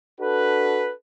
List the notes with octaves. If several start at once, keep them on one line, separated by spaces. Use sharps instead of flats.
D4 F#4 A4 B4